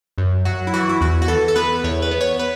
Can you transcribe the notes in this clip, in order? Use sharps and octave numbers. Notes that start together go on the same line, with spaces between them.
F#2
F#3 F#4
E4
E3 F#4
E4
E2 F#4
F#4
E3 A4
A4
B3 B4
E2 C#5
B4
B3
C#5
B4